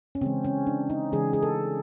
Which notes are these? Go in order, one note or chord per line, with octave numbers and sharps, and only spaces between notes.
C#4
C#3 E3 G#3 C4
C#4
D4
D#4
C#3 E3 G#3 G#4
G#4
A4